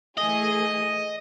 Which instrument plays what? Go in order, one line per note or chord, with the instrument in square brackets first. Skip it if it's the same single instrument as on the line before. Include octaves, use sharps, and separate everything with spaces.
[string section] E3 A3 G#4 [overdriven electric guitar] D#5